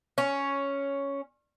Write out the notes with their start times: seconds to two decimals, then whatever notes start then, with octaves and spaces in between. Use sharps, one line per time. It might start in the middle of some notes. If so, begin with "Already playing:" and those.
0.18 C#4